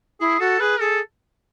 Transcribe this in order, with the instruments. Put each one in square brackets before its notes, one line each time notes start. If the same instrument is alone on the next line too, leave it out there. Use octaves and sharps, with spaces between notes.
[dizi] E4 [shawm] G#4
[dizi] F#4 [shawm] A4
[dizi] G#4 [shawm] B4
[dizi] G#4 [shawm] A4